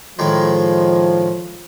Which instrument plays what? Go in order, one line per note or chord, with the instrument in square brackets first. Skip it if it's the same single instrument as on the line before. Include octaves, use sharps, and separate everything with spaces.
[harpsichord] A2 D#3 G#3 [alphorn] F3